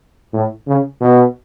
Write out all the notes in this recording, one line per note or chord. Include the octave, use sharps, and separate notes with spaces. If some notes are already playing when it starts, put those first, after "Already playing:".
A2
C#3
B2